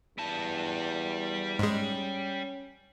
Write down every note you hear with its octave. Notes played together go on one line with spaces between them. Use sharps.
E2 G3 A5
G#2 G#3 C#4